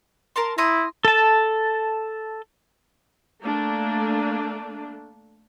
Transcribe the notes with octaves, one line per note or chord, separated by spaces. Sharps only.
A#4 A5 C6
E4 A#5 C6 D#6
A4 A5
A3 A#3 D4